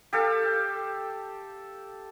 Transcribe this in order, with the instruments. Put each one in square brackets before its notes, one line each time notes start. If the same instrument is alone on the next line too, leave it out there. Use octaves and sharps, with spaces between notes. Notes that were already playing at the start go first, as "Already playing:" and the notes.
[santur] G4 A4 F5